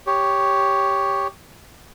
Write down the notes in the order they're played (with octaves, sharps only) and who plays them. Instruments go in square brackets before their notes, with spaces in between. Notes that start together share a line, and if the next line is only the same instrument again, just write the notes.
[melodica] G4 C#5